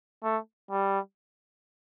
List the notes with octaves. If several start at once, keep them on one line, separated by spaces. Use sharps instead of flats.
A3
G3